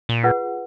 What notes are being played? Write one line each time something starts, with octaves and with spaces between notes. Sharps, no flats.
A#2
F4 G#4 B4 F#5